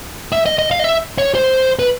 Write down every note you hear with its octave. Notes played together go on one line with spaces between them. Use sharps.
E5
D#5
D#5
F5
D#5
E5
C#5
C5
B4